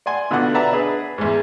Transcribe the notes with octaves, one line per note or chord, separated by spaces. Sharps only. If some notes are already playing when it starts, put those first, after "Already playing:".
D5 F#5 G#5 C6
B2 D3 B3 F4 F#5 D6
B4 D5 E5 F#5 A5 A#5
D4 G#4 B4
E2 G#2